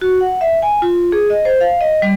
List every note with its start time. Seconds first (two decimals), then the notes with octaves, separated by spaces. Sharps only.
0.02 F#4
0.21 F#5
0.41 E5
0.62 G#5
0.82 F4
1.12 G#4
1.30 D#5
1.45 C5
1.61 F5
1.81 D#5
2.02 G3